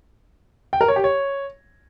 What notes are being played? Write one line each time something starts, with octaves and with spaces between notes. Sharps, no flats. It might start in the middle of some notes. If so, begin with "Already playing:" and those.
G5
A#4
C#5
G4
C#5